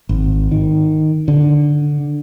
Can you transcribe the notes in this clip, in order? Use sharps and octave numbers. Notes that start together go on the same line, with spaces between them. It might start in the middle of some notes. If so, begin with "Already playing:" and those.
G#1
D#3
D3